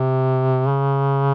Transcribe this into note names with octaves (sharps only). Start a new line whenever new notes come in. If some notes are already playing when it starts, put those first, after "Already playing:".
Already playing: C3
C#3